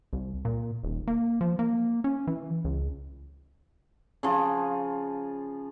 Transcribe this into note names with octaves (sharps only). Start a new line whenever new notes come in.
C2
A#2
D#1
A#3
F3
A#3
C#4
E3
C#2
C#3 F3